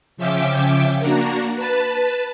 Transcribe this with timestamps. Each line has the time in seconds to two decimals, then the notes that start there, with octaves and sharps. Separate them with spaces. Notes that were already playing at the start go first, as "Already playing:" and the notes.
0.17 C#3 F3 C#4 E5 G5 D6
0.99 A#3 D4 F#4 A#4
1.56 B4 A5